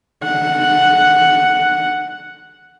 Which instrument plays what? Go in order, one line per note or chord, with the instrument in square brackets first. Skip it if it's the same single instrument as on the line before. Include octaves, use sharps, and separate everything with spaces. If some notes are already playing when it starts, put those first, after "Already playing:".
[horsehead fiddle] F#5